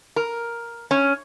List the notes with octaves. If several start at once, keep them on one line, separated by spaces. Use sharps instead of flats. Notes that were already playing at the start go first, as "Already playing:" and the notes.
A#4
C#4